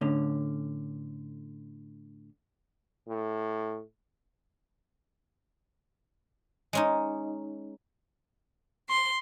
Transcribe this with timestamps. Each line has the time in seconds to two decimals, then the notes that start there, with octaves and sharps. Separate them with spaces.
0.01 A2 D3 C#4
3.08 A2
6.73 G#3 C#4 D#4
8.89 C6